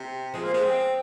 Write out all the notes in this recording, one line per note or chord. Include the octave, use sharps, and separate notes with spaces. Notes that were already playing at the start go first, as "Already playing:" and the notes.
Already playing: C3
F3 G#3
A#3
G#3
C4